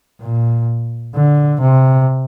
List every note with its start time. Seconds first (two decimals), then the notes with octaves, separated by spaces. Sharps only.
0.21 A#2
1.15 D3
1.61 C3